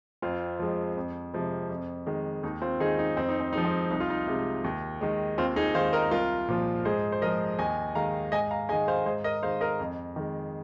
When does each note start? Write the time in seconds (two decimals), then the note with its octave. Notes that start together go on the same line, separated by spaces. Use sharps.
0.22 F2 C4 F4
0.59 F3 G#3
0.97 F2
1.34 C3 F3 G#3
1.69 F2
2.06 D#3 G#3
2.43 D#2 D#4
2.62 C4 F4
2.80 D#3 G#3 D#4 G#4
2.99 D#4
3.17 F2 C4
3.29 D#4
3.40 C4
3.53 F3 G#3 D#4
3.65 C4
3.90 C2 D#4
4.00 F4
4.10 D#4
4.27 C3 G#3
4.64 D#2
5.01 D#3 G#3
5.38 D#2 C4 F4
5.56 D#4 G#4
5.74 D#3 G#3 C5 F5
5.93 A#4 D#5
6.11 C2 F4 A#4
6.48 A#2 F3
6.85 G#2 G#4 C5
7.12 C5
7.22 F3 G#3 A#4 D#5
7.59 D#2 D#5 G#5
7.95 D#3 G#3 F5 A#5
8.32 G#2 D#5 G#5
8.51 F5 A#5
8.69 G#3 D#5 G#5
8.73 D#3
8.88 C5 F5
9.06 G#2 G#4 C5
9.24 A#4 D#5
9.43 D#3 G#3 C5 F5
9.61 A#4 D#5
9.79 F2
10.16 D#3 G#3